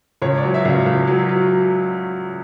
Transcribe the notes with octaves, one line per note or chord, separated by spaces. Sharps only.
C#2 C#5
D5
F#3
E5
C#2
F5
C#2
F#3
F#3